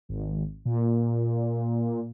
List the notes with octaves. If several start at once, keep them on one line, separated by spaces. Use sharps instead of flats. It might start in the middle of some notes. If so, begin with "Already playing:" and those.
G#1
A#2